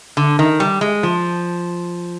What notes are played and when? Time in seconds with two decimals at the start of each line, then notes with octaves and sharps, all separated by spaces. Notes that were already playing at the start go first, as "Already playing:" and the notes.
0.17 D3
0.39 D#3
0.60 G3
0.81 G#3
1.03 F3